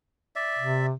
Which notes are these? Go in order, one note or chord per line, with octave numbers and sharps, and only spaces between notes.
D5 E5
C3